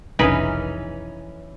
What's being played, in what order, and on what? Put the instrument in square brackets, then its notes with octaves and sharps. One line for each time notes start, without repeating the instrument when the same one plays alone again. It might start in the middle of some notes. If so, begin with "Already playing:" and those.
[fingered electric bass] F1 B1 [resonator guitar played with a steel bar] E3 C#4 D#4 [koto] G#4 A#4 B4